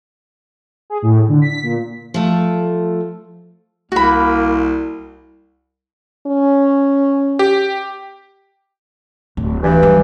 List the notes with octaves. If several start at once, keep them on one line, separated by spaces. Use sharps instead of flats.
G#4
A2
D3
B6
A#2
F3 A3
C2 A#3 F#4 B5
C#4
G4
D1
G2 E3
F#3 G3